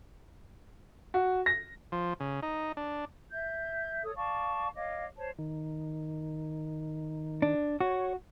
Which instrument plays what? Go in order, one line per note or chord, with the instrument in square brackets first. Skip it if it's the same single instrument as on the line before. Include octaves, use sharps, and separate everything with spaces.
[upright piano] F#4
A#6
[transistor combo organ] F3
C#3
D#4
D4
[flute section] E5 G6
A4 C#5 D#6
D5 F5 A5 C#6
C#5 D#5 F5 D6
C5 C#5 A5
[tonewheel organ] D#3
[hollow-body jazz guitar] D4
[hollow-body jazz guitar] F#4 [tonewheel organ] C#5